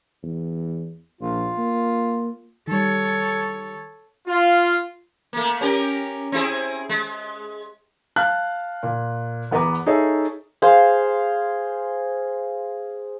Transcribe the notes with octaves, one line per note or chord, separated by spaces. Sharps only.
E2
A#1 F4
A#3
D#3 G3 A4 C#5
F4
A3 A#3
C#4 G4 A#4
C4 E4 G#4
G#3
F5 A5 F#6
A#2
E2 B3 B4 A#5 D6
D#4 G#4 A4 C#5 E5
G#4 C5 F5